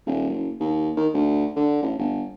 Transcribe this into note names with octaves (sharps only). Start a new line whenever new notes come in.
D#1
F#1
D#2
D#3
D2
D3
A1
G1